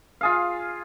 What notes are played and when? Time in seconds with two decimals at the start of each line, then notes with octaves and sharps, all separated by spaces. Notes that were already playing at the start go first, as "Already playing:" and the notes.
0.21 F4 G#4 F5